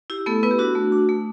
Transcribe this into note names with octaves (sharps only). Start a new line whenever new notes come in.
E4 G4
A3 B3 A4
B3 E4 B4
G4
D4 F#4
A3
D4
A3